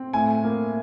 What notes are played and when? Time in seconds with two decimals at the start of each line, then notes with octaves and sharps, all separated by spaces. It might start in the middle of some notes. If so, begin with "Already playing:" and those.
Already playing: C4
0.13 A2 G#5
0.44 A#3